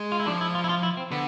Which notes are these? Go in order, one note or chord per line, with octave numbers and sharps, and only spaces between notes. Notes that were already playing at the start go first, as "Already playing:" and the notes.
Already playing: G#3
F4
E4
F3 D4
E4
F4
E4
F4
E4
C4
D3 B3